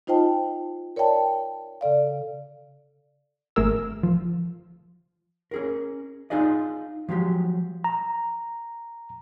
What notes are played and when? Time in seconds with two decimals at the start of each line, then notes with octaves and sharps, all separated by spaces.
0.07 D#4 F4 C5 D#5 G5 A5
0.96 A#4 C#5 D5 E5 G5 A5
1.81 C#3 A4 D5 F5
3.56 G#1 A3 G#4 A#4 E6
4.03 F3
5.51 C#4 G#4 A#4
6.30 D4 D#4 F4 G#4 D5 D#5
7.09 F3 F#3 G#3 G4
7.84 A#5